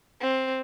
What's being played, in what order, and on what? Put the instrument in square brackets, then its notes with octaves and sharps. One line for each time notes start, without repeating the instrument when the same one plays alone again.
[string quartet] C4